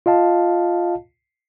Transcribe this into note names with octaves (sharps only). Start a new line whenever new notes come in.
F4 D#5 F5 A5